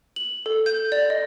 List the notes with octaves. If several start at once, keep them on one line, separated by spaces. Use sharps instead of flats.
F#7
A4
G6
D5
D#5